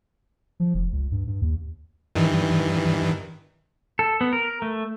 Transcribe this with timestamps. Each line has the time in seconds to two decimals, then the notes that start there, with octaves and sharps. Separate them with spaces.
0.60 F3
0.74 F1
0.93 C#2
1.12 G2
1.27 G2
1.42 D#2
2.15 G2 D#3 E3
3.99 A4
4.21 B3
4.33 A#4
4.62 A3